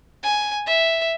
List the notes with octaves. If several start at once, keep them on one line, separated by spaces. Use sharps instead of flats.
G#5
E5